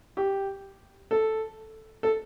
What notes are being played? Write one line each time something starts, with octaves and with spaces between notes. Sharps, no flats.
G4
A4
A4